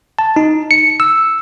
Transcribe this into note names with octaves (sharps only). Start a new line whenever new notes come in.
A5
D#4
C#7
E6